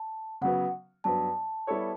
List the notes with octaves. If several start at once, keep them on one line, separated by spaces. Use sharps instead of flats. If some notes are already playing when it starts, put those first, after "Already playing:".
Already playing: A5
C#3 F#3 B3 F#5
G2 F#3 B3 A5
G3 B3 E4 A4 C#5